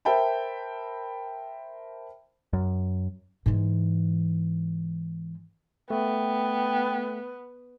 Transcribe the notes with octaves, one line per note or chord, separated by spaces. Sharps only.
A#4 C5 E5 G5 A5 B5
F#2
G#2 E3
A3 B3 G5